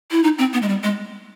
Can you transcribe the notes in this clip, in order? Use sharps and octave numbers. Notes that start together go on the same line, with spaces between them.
E4
D#4
C4
B3
G#3
G3
G#3